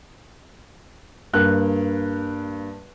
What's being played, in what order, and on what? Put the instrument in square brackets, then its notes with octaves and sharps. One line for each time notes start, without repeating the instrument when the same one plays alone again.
[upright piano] G2 A#3 F#6